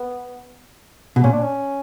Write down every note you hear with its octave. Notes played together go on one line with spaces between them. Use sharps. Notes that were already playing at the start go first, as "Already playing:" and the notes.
Already playing: B3
B2
A#2 C#4
D4
C#4